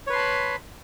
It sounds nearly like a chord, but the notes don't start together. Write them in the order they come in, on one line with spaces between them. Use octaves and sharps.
C#5 B4 C6 A5 B5